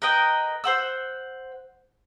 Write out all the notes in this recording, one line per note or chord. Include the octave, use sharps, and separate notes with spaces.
A#4 B4 D#5 G5
C5 F#5 E6